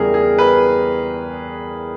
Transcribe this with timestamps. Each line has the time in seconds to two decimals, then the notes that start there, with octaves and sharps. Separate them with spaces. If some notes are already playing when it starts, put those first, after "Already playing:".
Already playing: E2 C#3 E3 G3 G#4 A#4
0.14 G#4
0.38 B4